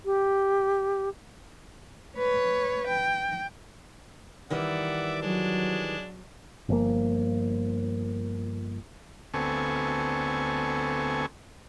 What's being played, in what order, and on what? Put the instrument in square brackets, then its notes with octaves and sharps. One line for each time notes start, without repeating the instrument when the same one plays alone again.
[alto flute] G4
[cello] B4 C#5
G5
[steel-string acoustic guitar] D#3 E3 G3 [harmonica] D5 E5 F#5
[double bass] F#3 [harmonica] G#3 D4
[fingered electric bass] G1 F3 A#3
[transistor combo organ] D2 B3 C4 A4 G#5 C#6